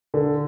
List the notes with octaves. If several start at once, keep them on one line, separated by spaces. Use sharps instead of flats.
D3